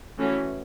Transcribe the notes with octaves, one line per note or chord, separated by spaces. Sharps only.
E3 A3 C#4 F#4